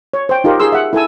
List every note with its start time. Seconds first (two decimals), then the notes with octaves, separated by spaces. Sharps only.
0.14 C#5
0.29 C5 G5
0.44 D#4 F4 G4 A#4
0.60 G#4 C6 E6
0.72 E5 F#5
0.93 E4 A4 G#5 E6